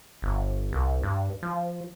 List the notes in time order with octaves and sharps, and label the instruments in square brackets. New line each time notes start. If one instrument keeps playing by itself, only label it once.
[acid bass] G1
C2
G2
F3